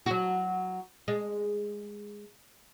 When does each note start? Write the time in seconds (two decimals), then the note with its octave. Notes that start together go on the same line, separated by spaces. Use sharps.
0.06 F#3 F#4
1.08 G#3